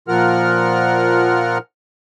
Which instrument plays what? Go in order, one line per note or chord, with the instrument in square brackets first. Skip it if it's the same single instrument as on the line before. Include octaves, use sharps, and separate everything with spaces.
[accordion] A#2 F3 F4 A#4 F#5 F6